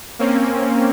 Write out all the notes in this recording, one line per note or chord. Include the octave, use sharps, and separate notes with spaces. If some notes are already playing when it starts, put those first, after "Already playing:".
A#3 C4 C#4